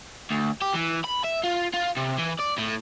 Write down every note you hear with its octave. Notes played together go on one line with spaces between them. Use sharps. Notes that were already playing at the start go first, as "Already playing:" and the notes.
D2
G4
E3
B5
E5
F4
F4
C3
E3
D5
A2